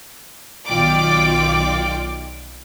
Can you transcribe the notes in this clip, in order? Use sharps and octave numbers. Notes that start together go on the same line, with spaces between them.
B1 D#3 F4 D5 G5 D6